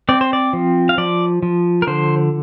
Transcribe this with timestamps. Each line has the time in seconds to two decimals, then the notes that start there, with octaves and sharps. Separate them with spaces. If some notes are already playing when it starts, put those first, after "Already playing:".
0.09 C4 D5
0.21 C5
0.33 D5
0.53 F3
0.89 F5
0.98 F3 D5
1.43 F3
1.82 A#4
1.87 D3 C5